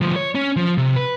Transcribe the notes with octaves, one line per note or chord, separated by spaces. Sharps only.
D2 F3
C#5
C#4
F3
C3
B4